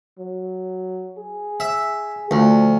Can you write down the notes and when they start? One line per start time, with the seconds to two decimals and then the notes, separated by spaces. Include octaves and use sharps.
0.19 F#3
1.18 G#4
1.60 E5
2.31 D2 F3